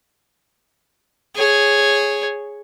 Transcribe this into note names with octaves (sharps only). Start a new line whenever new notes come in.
G#4 C#5